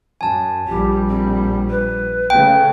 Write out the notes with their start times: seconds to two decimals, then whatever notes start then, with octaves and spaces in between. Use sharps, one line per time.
0.21 F#2 G#5 A5
0.68 A#1 G3 G4
1.08 C4
1.70 B4
2.30 C#3 A3 G5